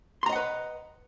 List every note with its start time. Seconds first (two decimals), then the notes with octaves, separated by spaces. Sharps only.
0.23 C6
0.26 A#5
0.29 D#5
0.32 F#5
0.36 B4